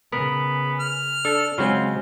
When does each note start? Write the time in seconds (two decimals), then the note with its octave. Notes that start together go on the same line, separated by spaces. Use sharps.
0.12 C#3 B3 A#4
0.80 F6
1.25 D4 A4
1.58 C#3 F#3 G#3 C4 C#4 F4